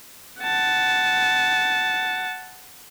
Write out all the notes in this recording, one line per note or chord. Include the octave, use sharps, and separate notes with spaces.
F#5 A5